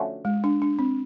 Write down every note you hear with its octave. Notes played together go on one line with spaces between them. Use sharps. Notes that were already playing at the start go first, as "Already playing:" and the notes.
Already playing: D3 F3 A3 C#4 F#4
G#3
D4
D4
C4